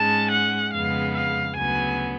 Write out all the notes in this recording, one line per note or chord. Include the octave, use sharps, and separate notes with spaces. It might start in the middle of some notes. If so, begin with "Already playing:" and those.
Already playing: G#2 G#3 C#4 A5
F#5
F2 C#3 G#3 B3 F5
F5
D2 C#3 F#3 B3 G#5